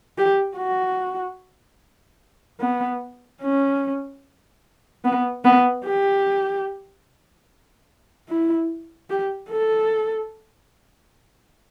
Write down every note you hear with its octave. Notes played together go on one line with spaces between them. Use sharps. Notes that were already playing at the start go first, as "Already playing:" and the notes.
G4
F#4
B3
C#4
B3
B3
G4
E4
G4
A4